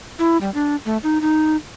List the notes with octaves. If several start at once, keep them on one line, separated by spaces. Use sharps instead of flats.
E4
G3
D4
A3
D#4
D#4